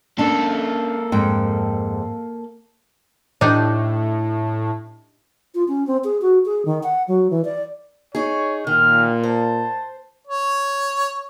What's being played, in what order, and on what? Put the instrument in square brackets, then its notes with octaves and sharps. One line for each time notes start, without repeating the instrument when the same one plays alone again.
[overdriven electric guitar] A#3 A4 [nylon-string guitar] C#4 D4
[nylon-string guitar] F2 G#2 G5
[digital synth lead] A2 [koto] D4 D#4 G4
[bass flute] F4
C#4
C4
G#4
F#4
G#4
D#3
F#5
F#3
E3
D5
[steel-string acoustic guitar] D#4 G#4 [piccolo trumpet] C#5
[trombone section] A#2 [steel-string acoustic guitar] D#3 [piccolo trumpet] F6
[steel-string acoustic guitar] C5 [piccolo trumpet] A5
[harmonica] C#5